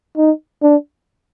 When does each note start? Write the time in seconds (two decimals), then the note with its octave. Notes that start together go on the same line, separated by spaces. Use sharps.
0.17 D#4
0.63 D4